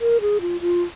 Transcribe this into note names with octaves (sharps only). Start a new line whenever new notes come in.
A#4
G#4
F4
F4